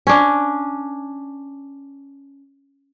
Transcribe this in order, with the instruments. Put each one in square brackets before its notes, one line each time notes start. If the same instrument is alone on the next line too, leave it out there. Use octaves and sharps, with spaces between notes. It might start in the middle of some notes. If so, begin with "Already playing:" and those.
[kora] C#4 D4